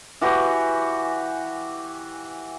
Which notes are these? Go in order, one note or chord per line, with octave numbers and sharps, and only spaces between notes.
E3 F#4 G4